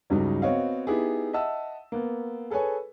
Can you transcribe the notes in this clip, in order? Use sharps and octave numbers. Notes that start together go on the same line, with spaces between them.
C#2 G2 C#3 F#3 D#4
B3 C4 F#4 C#5 D#5 F5
B3 D#4 E4 G4 G#4
D#5 E5 F#5 A5 E6
A#3 B3
G#4 A4 B4 C#5 G#5